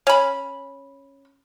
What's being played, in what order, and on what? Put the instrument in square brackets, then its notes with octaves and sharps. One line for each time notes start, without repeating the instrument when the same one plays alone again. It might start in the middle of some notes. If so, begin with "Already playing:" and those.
[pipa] C#4 B5